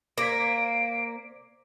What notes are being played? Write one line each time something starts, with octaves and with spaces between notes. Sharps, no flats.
A#3 C5 D5 D6 G#6 B6 D7